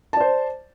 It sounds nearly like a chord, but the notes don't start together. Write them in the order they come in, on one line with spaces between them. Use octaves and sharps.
A5 D5 C5